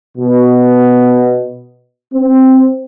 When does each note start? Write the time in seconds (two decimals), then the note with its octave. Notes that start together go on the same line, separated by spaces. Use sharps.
0.17 B2
2.13 C4